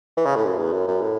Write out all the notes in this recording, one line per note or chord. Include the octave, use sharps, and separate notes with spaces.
E3
C#3
A2
F#2
E2
F#2
F#2
A2